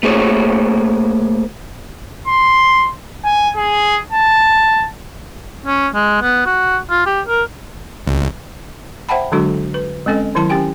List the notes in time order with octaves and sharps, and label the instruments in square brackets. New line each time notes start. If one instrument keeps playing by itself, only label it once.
[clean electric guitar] A3 A#3 G#4 C5 C#5
[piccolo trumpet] C6
G#5
G#4
A5
[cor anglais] C#4
G#3
B3
F#4
F4
G4
A#4
[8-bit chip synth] C#2
[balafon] C5 E5 F#5 G5 A5 B5
D3 F#3 G#3 D4 F#4 A4
B4
G#3 C4 C#4 A4 D#5
D#3 F#3 E4 A5 C6
C#4 G4 G5 G#5